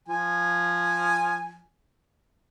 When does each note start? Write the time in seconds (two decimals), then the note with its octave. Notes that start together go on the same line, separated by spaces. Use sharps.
0.09 F3 G#5